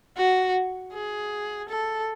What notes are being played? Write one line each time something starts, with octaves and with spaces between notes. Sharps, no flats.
F#4
G#4
A4